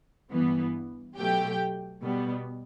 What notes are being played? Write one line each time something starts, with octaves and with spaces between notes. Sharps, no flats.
G2 E3 B3
B2 F#3 A3 G4 G5
B2 G3 B3